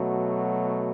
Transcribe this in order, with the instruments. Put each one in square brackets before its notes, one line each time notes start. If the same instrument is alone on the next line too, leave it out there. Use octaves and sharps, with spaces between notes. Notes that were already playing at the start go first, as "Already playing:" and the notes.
Already playing: [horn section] B2 F#3 A3